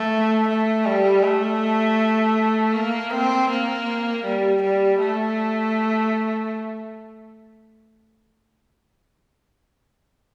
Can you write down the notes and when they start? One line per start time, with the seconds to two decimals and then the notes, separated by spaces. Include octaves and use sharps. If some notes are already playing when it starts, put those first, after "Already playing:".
Already playing: A3
0.48 A3
0.85 G3
1.23 A3
2.74 A#3
3.11 C4
3.50 A#3
4.24 G3
4.62 G3
5.00 A3